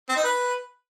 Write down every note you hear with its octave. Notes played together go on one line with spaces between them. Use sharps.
C4
D#4
B4